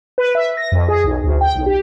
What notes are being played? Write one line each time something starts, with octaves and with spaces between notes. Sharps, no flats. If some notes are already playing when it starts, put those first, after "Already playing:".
B4
E5
A#6
F2
G#4
B1
D2
G5
B1
G4